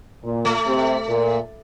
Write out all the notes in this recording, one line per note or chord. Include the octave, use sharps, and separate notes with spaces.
A#2
A3
C3
A#2